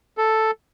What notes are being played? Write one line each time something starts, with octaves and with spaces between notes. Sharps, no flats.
A4